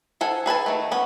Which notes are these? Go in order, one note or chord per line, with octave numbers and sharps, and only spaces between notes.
F3 A4 F#5 G#5
G#4 B4 G#5 A5
D#3 A3
B3 C#4